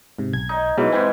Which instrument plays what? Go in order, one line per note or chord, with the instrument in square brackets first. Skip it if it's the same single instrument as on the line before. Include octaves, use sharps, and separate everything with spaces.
[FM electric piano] G#2 C3
B1 G#6
[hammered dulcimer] D#4
[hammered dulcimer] G#2 E3 [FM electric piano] B2 F#3 G#3
[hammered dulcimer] G#2 C5 G#5 [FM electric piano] C4